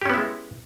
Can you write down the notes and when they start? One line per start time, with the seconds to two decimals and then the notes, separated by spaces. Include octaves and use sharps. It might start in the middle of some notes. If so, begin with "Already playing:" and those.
0.01 G4
0.06 C#4
0.10 B3
0.14 E4
0.18 G#3